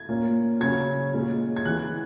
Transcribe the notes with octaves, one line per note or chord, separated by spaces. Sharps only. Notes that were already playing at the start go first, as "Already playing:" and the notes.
Already playing: G#6
A#2 A#3 C#4
C#3 F#3 C#4 G#6
A#2 G#3 C#4
G#6
E3 G#3 B3 F#6